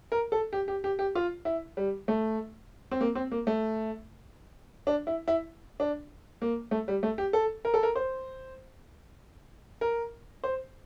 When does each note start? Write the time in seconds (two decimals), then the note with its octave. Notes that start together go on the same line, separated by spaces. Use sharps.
0.12 A#4
0.32 A4
0.53 G4
0.68 G4
0.84 G4
0.99 G4
1.15 F4
1.45 E4
1.77 G3
2.08 A3
2.91 C4
3.01 A#3
3.15 C4
3.31 A#3
3.47 A3
4.87 D4
5.07 E4
5.28 E4
5.80 D4
6.42 A#3
6.71 A3
6.88 G3
7.03 A3
7.18 G4
7.33 A4
7.65 A#4
7.74 A4
7.83 A#4
7.96 C5
9.81 A#4
10.44 C5